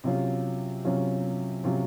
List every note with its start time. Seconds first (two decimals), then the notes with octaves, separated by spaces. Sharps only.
0.04 C3 F#3 C#4 F4
0.85 C3 F#3 C#4 F4
1.64 C3 F#3 C#4 F4